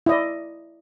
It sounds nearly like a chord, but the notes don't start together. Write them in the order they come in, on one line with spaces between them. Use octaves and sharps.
E4 D#5 D5